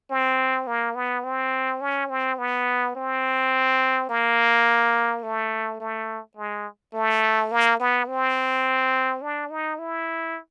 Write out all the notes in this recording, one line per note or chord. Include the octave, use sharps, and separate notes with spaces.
C4
A#3
B3
C4
C#4
C4
B3
C4
A#3
A3
A3
G#3
A3
A#3
B3
C4
D4
D#4
E4